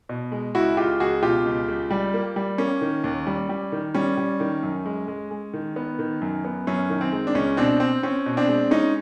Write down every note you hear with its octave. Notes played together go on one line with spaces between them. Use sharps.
B2
G#3
C#2 E4 F#4
C#2 F4 G4
C#2 F#4 G#4
B2 F4 G4
C#2
C#2
G3
A#3
G3
A#3 C#4
D#3
D#2
G3
G3
D#3
G3 C#4
G3
D#3
F#2
G#3
G#3
G#3
D#3
B3
D#3
F#2
B3
F#2 C#4
D#3
C4
G#3
D4
C#2 C#4
B2 C4 D4
C4
C4 C#4
B2
C4 D4
G#3
G#3 C#4 D#4